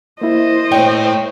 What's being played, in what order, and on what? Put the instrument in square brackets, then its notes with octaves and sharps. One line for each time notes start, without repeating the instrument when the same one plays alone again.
[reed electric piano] A#3 E4 [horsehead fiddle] C5 D#5
[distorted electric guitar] A3 C#5 [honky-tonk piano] G5